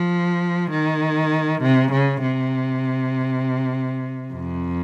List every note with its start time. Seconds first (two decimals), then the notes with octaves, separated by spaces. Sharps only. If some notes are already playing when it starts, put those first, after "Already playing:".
Already playing: F3
0.71 D#3
1.61 C3
1.91 C#3
2.22 C3
4.33 F2